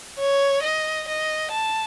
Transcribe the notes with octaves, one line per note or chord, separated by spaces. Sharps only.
C#5
D#5
D#5
A5